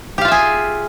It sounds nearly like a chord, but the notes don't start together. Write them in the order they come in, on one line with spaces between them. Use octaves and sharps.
G4 F5 F4 E5 G#4